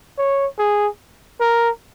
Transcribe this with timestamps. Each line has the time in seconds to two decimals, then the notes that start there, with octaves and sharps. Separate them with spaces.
0.18 C#5
0.59 G#4
1.41 A#4